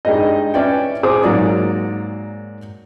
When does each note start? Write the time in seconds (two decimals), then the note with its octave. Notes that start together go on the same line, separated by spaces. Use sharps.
0.05 G2 G3 G#3 D#4 D#5
0.54 C#4 B4 D5 E5 G5
1.03 G#4 C5 C6 D6 D#6
1.24 G#2 F#3 A#3 D5